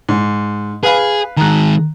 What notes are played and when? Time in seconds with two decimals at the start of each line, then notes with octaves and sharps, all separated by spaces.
0.09 G#2
0.83 G#4 B4 F5 B5
1.37 D#3 G#3 A#5 F#6